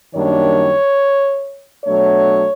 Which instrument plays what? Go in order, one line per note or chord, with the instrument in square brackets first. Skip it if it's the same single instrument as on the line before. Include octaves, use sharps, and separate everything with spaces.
[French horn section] F#2 D#3 G3 A#3 D4 C#5
B2 F#3 A3 D4 C#5